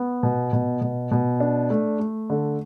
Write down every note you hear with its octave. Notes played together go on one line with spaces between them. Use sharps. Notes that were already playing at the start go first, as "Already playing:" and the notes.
Already playing: B3
B2
B2
B2
B2
D4
A3
A3
D3